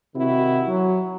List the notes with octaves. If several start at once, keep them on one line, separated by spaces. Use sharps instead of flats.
C3 D#3 E4 F#4
F#3